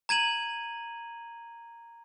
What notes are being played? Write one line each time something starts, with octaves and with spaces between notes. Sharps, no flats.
A#5 G#6 D#7 F#7